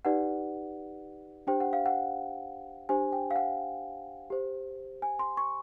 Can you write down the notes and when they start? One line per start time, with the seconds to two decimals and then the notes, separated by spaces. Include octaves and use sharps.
0.05 D#4 G4 B4 D5 F#5
1.47 D4 G4 C5 G5
1.60 F#5
1.73 F5
1.86 F#5
2.89 D4 G4 C5 G#5
3.12 G5
3.31 F5
3.36 F#5
4.30 G4 C5
5.02 G#5
5.19 C6
5.37 C#6